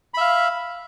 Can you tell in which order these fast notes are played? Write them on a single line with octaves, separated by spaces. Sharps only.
B5 E5 F5